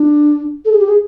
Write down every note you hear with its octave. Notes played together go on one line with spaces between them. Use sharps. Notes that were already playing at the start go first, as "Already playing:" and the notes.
Already playing: D4
A4
G#4
G4
G#4